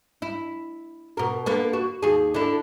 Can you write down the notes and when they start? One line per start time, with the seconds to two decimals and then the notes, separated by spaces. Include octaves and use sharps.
0.22 E4
1.17 B2 A#4
1.46 D3 A#3 B3
1.73 F#4
2.02 D#2 G#4
2.34 D3 E4